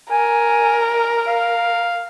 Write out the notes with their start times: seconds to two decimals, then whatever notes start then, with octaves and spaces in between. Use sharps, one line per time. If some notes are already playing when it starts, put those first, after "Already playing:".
0.11 A#4 G#5
1.27 F5